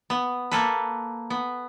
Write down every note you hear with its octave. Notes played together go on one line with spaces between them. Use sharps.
B3
A#3 A4 B4
B3